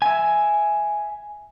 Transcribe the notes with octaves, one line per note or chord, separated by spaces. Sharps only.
E5 G#5